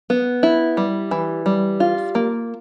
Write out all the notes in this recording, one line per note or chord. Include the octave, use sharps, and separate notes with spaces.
B3
E4
G3
E3
G3
F4
A#3